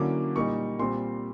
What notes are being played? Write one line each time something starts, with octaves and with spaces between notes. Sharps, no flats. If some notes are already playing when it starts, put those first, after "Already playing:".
Already playing: D3 F#3 A#3 C#4 E4 D6
A#2 G3 A#3 D#4 C#6
A#2 G3 C4 C6